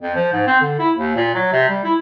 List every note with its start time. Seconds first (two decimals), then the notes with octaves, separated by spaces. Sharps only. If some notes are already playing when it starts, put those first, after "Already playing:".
0.01 F2
0.15 F3
0.32 G#2
0.47 C4
0.61 D3
0.79 E4
0.97 D#2
1.16 A#2
1.35 F#3
1.52 C3
1.68 G3
1.84 E4